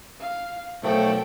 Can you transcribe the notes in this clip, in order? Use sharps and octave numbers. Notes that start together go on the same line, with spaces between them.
F5
B1 F#2 F3 A3 F#4 A4 G5